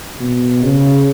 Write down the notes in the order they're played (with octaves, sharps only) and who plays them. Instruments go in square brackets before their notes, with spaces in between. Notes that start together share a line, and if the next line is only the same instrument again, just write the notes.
[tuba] B2
C#3